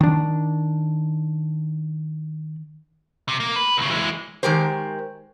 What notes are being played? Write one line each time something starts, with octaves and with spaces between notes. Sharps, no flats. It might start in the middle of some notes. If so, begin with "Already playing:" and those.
D#3 D4
C3
A#3
B4
C2 C#3
E3 G#3
D#3 G#3 G4 A#4 C5